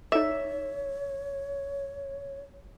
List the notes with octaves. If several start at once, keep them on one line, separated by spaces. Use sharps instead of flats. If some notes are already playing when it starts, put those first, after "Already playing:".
D#4 A4 C#5 D5 E5